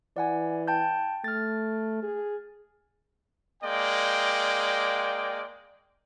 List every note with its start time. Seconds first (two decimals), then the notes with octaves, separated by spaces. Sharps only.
0.16 E3 D5 F#5 G#5
0.68 G5 A5 G6
1.24 A3 F6 A6
2.03 G#4
3.63 G#3 A#3 D5 G5